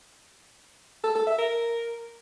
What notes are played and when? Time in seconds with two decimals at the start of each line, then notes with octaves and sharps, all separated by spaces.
1.04 A4
1.15 A4
1.27 E5
1.38 A#4